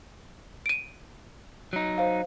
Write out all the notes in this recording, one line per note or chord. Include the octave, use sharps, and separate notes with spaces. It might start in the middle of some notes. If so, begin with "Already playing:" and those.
D7 D#7
F#3 D#4
C5 F5